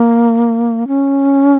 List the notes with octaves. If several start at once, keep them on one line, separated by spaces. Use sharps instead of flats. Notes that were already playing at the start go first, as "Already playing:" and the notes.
Already playing: A#3
C#4